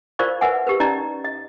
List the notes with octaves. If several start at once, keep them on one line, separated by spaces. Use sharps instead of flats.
F4 A#4 C5 D5 F5 C#6
A#4 B4 E5 F#5 G#5
G4 A#4 B4
C#4 D#4 G4 D5 D#5 A#5
D#5